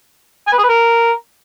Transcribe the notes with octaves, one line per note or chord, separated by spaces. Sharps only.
G#5
B4
G#4
B4
A#4